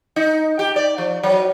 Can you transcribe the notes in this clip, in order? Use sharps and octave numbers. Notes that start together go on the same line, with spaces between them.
D#4
G4
D5
F3
F#3